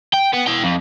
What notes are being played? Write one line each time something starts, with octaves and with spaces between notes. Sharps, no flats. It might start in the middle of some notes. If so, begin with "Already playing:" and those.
G5
B3
E4 G5
F2